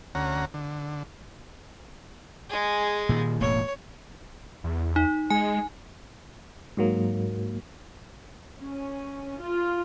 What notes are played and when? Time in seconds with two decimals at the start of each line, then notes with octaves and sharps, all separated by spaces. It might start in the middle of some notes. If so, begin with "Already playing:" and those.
0.15 D2 C#4 F#5 A#5
0.54 D3
2.50 G#3 G#4
3.09 A#2 D#3
3.41 E1 A2 A#3 C#5
4.64 E2
4.96 D#4
5.30 G#3 G#5
6.77 G#2 F#3 A#3
8.61 C#4
9.41 F4